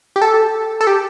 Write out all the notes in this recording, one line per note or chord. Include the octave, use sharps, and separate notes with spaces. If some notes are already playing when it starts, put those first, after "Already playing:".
G4
A4
A4
G4